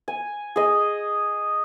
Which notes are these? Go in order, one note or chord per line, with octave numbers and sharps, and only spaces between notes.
G#5
G#4 D#5